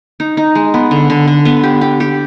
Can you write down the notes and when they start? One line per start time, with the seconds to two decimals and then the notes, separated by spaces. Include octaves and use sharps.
0.20 D#4
0.37 D#4
0.55 G#3
0.74 B3
0.91 D3
1.10 D3
1.28 D3
1.45 B3
1.64 G4
1.81 G4
2.00 G4